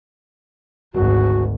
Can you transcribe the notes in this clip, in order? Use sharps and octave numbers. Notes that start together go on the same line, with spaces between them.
G#1 D2 F#4